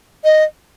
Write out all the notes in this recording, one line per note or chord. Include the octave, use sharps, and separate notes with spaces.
D#5